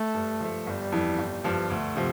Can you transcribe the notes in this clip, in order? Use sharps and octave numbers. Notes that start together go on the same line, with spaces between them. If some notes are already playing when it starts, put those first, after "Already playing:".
Already playing: A3
G2
F3 A3
G1 G3
F2 E3
G1
G2 F3
D2 A3
C3 F3